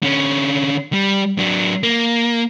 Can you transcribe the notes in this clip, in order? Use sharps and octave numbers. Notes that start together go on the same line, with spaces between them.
D3 C#4
G3
F#3 D4
A#3